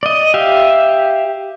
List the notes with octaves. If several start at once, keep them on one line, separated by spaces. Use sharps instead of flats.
D5 D#5
G4 E5 F5